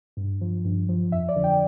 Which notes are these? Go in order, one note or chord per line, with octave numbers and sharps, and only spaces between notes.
G2
F3
G2
F3
F2 E5
D5
D3 F3
G5